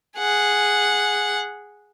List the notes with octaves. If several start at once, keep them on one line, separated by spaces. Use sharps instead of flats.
G#4 F#5